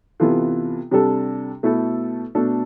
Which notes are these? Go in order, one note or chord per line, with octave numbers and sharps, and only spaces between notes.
C3 E3 B3 F4 A4
C3 G3 D4 A4
B2 A3 E4 A4
B2 A3 D4 A4